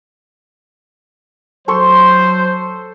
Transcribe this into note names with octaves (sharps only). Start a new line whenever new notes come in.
F#3 A4 C5 C6 C#6